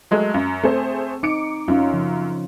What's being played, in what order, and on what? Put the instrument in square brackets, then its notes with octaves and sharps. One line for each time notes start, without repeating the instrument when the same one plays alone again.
[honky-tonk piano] F#3 G#3 A3
F#2
[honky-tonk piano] A3 G#4 C5 [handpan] C4
[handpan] D#4 [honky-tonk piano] D6 C#7 D7
[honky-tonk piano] F#2 [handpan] C#4 D#4 F4
[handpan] C#3 F3